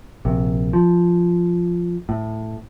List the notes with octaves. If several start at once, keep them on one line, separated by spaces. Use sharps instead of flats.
A#1 C3
F3
A2